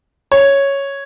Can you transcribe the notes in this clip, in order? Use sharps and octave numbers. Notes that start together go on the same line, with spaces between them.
C#5